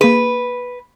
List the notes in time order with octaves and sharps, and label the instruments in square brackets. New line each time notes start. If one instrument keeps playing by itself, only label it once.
[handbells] A#3 G#4 [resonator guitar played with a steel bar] B4